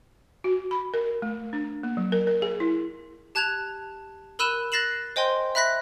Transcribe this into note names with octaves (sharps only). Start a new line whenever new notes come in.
F#4
B5
A#4
A3
D4
A#3
F#3
A#4
A#4
G#4
E4
G4 A5 F#6 G#6 E7 F7
A#4 B5 E6 F#6 D#7 E7
F#6 A6 A#6 C7 E7 F#7
C5 D#5 G5 G#5 C6 G6
E5 B5 F#6 A#6 B6